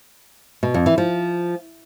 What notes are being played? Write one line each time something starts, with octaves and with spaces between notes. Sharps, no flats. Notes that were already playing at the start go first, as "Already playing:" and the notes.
B2
F2
E3
F3